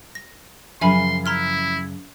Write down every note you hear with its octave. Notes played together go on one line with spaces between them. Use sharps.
A#6
F#2 C#3 F3 E5 G#5 B5 C6
E4 A#5 C6 F6